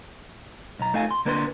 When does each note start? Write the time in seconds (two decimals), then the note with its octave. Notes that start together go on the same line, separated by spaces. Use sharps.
0.79 B1 A#5
0.94 A3 D#4 F5 G#5
1.11 C6
1.25 D3 A#3 D4 B4 A5 C6